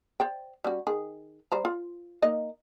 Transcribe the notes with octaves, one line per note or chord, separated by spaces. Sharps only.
C5 D5 G5
G3 C#4 F#4
D#3 G#4
G3 C5 A#5
F4
A#3 D#4 D#5